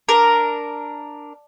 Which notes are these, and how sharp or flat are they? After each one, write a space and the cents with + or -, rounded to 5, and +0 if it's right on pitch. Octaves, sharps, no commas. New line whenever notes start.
D4 +0 A#4 +0